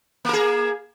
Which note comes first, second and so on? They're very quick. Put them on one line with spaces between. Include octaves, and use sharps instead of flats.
A#3 A#4 G#4